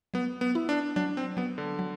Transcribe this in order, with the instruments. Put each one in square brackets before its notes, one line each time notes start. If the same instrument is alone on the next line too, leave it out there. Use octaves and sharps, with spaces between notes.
[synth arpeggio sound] F#3 [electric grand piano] B3
[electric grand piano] B3
[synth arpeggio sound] E4
[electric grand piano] D4
[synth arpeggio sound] F#3 [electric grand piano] D4
[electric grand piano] C4
[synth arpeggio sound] F#3 [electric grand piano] B3
[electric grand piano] D3
[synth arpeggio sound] F#3